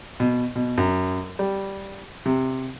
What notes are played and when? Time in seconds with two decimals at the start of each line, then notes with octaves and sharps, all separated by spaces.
0.20 B2
0.56 B2
0.78 F#2
1.39 G3
2.26 C3